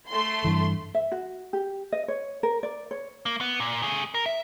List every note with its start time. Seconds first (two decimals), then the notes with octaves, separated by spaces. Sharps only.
0.10 A3 C6
0.44 G2 E3
0.94 E5
1.12 F#4
1.53 G4
1.92 D#5
2.08 C#5
2.43 A#4
2.63 D5
2.91 C#5
3.26 A#3
3.41 B3
3.60 A#2
3.82 A3 G#4
4.14 A#4
4.26 E5